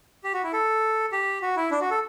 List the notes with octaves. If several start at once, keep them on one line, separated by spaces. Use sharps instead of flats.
G4
F#4
E4
A4
G4
F#4
E4
D4
F#4
A4